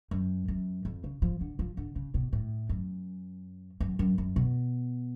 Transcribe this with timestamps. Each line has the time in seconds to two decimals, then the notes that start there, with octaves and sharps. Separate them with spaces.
0.11 F#2
0.48 F#2
0.85 F2
1.04 C#3
1.22 F3
1.41 D3
1.59 F3
1.77 D3
1.96 C#3
2.14 B2
2.33 A2
2.69 F#2
3.80 F#2
3.99 F#2
4.18 F#2
4.36 B2